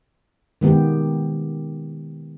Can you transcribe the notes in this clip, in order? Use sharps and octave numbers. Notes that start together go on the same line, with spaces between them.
D#3 G#3 B3 G4